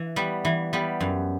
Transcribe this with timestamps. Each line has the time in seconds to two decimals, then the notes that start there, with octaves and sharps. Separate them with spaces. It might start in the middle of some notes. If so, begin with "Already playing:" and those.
Already playing: E3
0.16 G3 B3
0.45 E3
0.73 G3 B3
1.01 F#2